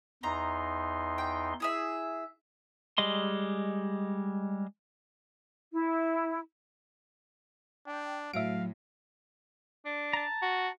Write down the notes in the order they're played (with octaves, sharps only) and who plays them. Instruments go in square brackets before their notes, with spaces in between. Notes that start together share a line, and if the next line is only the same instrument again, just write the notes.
[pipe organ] E2 D#4 C6 [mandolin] A#5
[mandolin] G5
E4 G#4 E5
[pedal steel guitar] G3 G#3 D#5 C6
[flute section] E4
[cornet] D4 [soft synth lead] G5
[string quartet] A2 [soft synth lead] F#3 [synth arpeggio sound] E5 D7 [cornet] F5
[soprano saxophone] D4
[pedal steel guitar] A5 A#5
[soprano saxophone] F#4